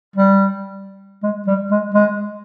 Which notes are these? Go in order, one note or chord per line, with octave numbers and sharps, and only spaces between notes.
G3
G#3
G3
G#3
G#3